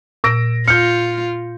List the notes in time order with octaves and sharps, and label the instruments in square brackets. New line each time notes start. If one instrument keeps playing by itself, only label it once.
[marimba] A#2 [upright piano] E6 A#6 D7
[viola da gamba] F4 [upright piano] F6 G6 [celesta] C#7